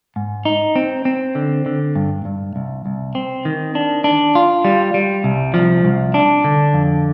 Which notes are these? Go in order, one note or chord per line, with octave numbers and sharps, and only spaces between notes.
G#2
D#4
C4
C4
D3
D3
G2
G2
C2
C2
C4
D#3
D4
D4
F4
G3
G3
C2
F3
C2
D4
D3
F2